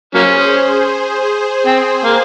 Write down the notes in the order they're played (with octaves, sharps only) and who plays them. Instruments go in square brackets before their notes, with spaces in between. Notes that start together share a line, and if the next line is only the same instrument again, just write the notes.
[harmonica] F#3 A#3 C#4 [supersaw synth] G#4 C5
[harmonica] C4
A#3